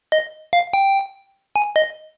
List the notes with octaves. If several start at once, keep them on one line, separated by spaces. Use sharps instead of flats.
D#5
F5
G5
G#5
D#5